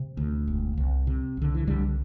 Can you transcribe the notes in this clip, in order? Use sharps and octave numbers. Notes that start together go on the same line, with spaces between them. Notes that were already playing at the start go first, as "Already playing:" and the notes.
Already playing: C3
D2
E1
C2
C3
C2 D3
E3
C2 D3 G3